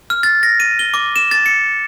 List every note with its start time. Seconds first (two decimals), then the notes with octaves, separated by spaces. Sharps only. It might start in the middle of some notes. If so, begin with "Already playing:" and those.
0.10 F6
0.23 A6
0.43 A#6
0.60 D#7
0.79 G7
0.94 D6
1.16 E7
1.31 A6
1.46 C#7